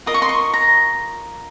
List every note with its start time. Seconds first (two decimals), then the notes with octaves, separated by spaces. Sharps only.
0.06 F4 A#4 D#5 D#6
0.14 C#6
0.22 C6
0.29 C#6
0.54 A#5